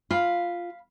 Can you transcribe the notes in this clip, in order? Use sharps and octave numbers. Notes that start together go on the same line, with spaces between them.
F4 F5 B5